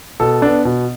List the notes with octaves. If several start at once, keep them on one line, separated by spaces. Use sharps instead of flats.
B2 A4
B3 D4
B2